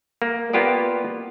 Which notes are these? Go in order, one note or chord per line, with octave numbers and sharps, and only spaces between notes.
A#3
A#3 B3 F4 G4 D5